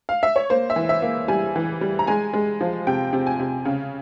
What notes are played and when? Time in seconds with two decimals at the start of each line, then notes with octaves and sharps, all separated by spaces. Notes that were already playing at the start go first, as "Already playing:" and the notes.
0.09 F5
0.23 E5
0.36 C#5
0.50 A#3 C5
0.70 E5
0.76 E3
0.89 E5
1.02 A#3
1.28 G3 G#5
1.56 E3
1.81 G3
1.99 A#5
2.07 G#3 G#5
2.34 G#3
2.61 F3
2.87 C3 G5
3.13 C3
3.27 G#5
3.40 C3
3.65 C#3